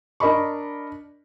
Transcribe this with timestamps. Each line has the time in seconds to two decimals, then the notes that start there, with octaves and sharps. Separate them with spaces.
0.20 D4 A#4 D#5 B5 C#6